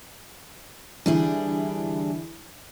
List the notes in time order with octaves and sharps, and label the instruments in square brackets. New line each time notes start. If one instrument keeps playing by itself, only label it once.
[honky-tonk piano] D3 E3 E4 [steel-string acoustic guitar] G3 D4 G#4